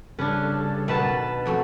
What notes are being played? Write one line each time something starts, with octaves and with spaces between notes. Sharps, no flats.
G2 C#3 C#4 D4 A4 B4
B2 D#3 F#3 B4 A5
F2 F3 F#3 A3